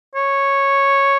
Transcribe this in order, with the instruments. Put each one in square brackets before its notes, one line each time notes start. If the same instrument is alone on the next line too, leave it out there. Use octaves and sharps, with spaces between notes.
[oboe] C#5